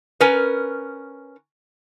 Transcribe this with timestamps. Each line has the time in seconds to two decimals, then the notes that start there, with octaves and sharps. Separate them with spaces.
0.20 C#4 A#4 B4